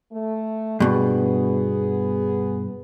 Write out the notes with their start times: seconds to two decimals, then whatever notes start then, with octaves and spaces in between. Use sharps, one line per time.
0.12 A3
0.80 G2 B2 B3 G#4